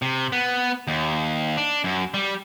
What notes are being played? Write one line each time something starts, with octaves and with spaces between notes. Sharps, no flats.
C3
B3
D#2
D4
F#2
G3